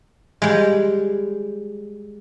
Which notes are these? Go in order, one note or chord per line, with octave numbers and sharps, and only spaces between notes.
G3 G#3